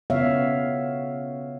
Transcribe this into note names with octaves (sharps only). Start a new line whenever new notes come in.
C#3 B3 C#5 E5 F5